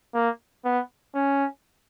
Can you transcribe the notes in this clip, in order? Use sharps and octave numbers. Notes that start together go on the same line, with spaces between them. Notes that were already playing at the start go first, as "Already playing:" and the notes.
A#3
B3
C#4